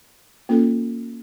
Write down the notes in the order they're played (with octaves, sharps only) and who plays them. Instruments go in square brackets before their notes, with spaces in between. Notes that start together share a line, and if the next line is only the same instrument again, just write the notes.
[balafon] A#3 C#4 F4 A4